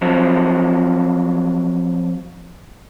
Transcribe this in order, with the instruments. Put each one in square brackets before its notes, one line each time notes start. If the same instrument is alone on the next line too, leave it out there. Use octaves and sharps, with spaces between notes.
[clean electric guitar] F3 F#3 C4